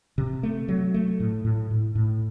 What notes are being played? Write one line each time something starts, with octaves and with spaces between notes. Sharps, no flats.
C3
A3
F#3
A3
A2
A2
A2
A2